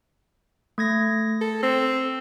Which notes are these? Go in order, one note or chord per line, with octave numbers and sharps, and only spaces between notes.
A3 G#6 A#6
A4
C4 E6